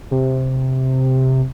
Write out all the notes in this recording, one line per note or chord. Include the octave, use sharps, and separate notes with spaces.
C3